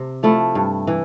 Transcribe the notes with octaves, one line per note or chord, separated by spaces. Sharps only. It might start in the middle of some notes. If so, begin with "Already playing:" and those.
Already playing: C3
F3 A3 E4
G2
E3